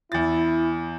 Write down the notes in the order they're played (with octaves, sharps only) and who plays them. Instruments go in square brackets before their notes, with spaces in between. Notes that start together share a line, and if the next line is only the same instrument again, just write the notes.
[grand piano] E2 A6 [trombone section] E4